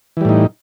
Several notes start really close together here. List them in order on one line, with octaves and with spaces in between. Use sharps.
E3 G3 A2 D#4